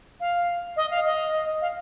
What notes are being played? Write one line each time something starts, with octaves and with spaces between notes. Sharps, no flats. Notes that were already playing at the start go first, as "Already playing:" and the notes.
F5
D#5
F5
D#5
F5